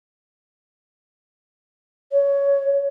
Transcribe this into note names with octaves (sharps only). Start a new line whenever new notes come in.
C#5